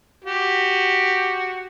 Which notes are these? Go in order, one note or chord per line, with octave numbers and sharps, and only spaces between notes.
F#4 G4